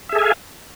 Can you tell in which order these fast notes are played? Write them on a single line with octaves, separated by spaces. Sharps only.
E5 G#4 A4 G#5 F5